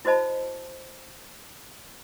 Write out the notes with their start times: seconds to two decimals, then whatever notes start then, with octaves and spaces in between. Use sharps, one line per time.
0.05 E4 F#4 C5 D#5 A5 B5